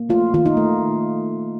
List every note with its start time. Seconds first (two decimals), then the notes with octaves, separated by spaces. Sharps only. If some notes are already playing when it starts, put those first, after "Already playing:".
Already playing: A#3
0.09 A3 F4
0.34 D#3 F4
0.46 D#4
0.57 A3